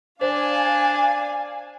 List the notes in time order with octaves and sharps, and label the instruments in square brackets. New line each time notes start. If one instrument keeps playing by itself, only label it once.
[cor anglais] D4 [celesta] C5 [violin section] F5 G#5